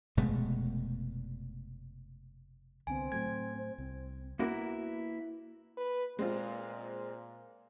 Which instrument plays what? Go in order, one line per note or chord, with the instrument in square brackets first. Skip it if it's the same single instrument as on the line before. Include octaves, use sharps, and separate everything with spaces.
[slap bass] F1 B2 G#3 A3
[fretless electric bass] C2 D3 B3 [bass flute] C4 [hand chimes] G#5
[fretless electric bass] A2 F#3 A3 [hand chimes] G#6
[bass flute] C5
[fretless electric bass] C2 [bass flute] C4
[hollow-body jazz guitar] A#3 B3 E4 F#4 A#4
[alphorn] B4
[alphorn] A#2 [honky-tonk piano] G#3 C4 F4